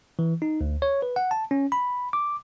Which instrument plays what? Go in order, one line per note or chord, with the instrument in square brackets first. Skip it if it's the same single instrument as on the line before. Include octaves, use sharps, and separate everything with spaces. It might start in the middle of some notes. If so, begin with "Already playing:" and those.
[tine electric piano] E3
D#4
D2
C#5
B4
F#5
A5
C#4
B5
D6